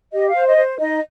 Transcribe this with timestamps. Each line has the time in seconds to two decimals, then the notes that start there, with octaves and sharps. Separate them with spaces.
0.12 G4 D#5
0.29 F5
0.34 C5
0.47 D#5
0.57 C5
0.79 D#4 D#5